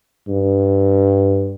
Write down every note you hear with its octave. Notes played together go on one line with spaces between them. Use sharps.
G2